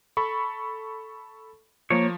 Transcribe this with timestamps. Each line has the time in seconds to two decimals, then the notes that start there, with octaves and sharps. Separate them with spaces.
0.17 A4 B5 C#6
1.90 F3 A#3 C#5